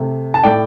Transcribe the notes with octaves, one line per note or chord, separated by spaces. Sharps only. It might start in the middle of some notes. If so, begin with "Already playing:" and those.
Already playing: C3 A3
A5
A2 A3 D5 G5